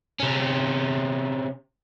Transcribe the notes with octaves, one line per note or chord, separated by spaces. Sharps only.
C3 C#4